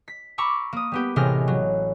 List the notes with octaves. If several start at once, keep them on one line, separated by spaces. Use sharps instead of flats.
B6
A#5 B5 C#6 D6 E6
A#3 D#6
G3 B3 G4
A1 C3 G#3 G4 F6 A#6
F#3